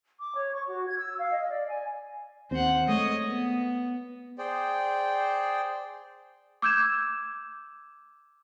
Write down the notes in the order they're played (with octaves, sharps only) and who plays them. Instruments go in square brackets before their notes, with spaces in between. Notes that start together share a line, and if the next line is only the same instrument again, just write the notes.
[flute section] D6
C#5
C#6
F#4
G#6
E6
F5
D#5
D5
G#5
[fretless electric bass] D#2 C4 [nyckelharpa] C5 F#5
[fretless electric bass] G#3 A3 [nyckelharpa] C#5 D#5
[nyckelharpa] B3
[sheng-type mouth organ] G#4 C5 D5 G5
[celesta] D6 E6 G6 G#6 E7